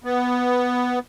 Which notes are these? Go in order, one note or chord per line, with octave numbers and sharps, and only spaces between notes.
B3